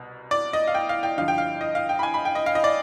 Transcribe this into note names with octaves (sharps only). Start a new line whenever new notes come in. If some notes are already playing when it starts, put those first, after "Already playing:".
Already playing: C2 B2
D5
D#5
F5
G5
F5
G5
G2 D3 F3 F5
G5
F5
D#5
F5
G5
B5
G#5
B5
G5
D#5
F5
D#5
D5